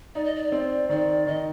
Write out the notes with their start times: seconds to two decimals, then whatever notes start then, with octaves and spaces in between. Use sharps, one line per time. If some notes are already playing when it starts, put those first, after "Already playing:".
0.15 D#4 D5
0.25 D#5
0.35 D5
0.52 C4 D5
0.89 D#3 D5
1.26 D#3 D#5